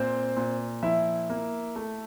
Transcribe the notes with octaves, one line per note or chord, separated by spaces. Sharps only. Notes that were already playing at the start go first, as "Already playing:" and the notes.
Already playing: A#2 C4 C5
A#2
F3 E4 E5
A#3
A3